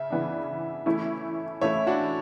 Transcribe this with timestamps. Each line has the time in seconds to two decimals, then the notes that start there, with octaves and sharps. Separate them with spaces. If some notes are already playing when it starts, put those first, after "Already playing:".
Already playing: C#3 E5
0.10 C#3 E3 B3 D4
0.86 E3 A3 C#4 E4
1.61 E3 A3 C#4 E4 C#5 E5
1.87 D4 F#4